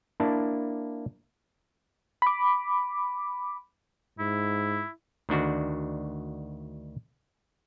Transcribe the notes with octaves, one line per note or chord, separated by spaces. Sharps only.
A#3 D4 E4 A5
B5 D6
G#2 E4
D2 D#3 D4 F#4